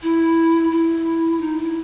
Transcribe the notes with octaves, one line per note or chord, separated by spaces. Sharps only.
E4
E4
D#4
E4